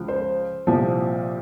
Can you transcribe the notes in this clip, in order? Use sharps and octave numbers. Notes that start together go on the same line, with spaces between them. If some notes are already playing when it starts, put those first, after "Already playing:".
Already playing: C#2 F3
C5
C2 A#2 F3